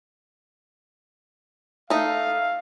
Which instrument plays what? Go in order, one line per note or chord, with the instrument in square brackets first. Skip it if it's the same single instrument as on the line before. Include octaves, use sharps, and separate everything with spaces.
[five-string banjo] A3 D#4 [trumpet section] E5 F5